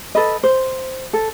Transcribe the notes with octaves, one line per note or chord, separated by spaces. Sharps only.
A4 B4 D#5
C5
A4